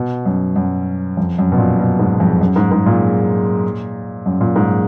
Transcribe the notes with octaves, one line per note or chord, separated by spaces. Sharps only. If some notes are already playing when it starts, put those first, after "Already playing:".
Already playing: B2
F#2
F#2
F2
F#2
B2
A#2
B2
G#2
F2
F#2
G#2
G#2
A#2
F#2
A#2
G#2